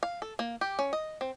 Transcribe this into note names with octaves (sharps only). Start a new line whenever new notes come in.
F5
A4
A#3
G4
C#4
D#5
C4